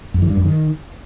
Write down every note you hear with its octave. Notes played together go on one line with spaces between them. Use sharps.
F#2
E3
G2
F#2
D#3